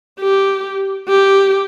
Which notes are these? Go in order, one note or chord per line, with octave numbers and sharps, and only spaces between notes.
G4
G4